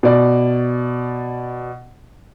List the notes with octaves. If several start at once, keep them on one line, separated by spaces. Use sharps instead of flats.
B2 D5